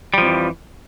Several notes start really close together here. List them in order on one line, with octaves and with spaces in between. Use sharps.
G3 F3 F2 E3